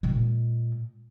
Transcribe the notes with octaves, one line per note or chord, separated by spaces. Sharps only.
A#2 G#3